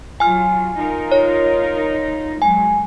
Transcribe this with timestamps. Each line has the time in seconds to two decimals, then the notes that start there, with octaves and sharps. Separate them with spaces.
0.20 F#3 F4 G#5 F6
0.78 D#4 F4 A#4
1.12 C#5
2.42 F#3 G#3 G#5